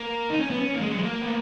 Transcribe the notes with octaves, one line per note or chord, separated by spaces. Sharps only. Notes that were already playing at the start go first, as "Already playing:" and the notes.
Already playing: A#3
D#4
C#4
B3
C#4
A#3
G#3
F#3
G#3
A#3
B3